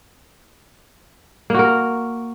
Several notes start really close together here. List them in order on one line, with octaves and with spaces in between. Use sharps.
A#3 F#4 A#4